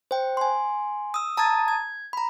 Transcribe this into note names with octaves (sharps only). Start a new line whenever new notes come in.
C5 G5
G#5 C6
D#6 E6
A5 A#5 D#6 G#6 A6
G#6
A#5 B5